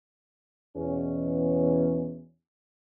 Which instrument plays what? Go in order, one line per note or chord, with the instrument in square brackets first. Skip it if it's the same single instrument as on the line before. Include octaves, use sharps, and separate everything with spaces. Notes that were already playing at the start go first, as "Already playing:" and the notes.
[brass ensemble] E2 B2 C#4